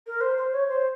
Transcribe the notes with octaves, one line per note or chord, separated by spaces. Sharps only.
A#4
C5
C5
C#5
C5